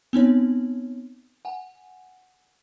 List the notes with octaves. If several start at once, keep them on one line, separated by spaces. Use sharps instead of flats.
B3 C4 D#4 C#5
F#5 G#5